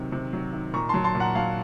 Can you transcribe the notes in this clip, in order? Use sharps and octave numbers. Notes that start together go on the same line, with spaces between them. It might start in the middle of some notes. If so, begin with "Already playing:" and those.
Already playing: C3 D#3 F#3
C3
F#3
D#3
A#2 A#5 C#6
F#3 A5 C6
A5 C6
A#2
F#5 A#5
F#3 F5 A5